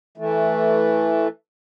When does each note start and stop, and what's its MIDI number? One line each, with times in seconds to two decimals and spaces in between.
0.18 1.28 52
0.18 1.28 57